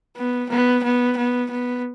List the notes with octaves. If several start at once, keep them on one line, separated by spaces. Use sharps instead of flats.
B3
B3
B3
B3
B3